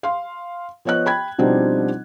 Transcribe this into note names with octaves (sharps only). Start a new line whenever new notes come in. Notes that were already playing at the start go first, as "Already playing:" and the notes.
F5 C6
F3 B3 C#5 D#5 F#6
G5 B5 G#6
B2 F3 G3 C4 D4 D#4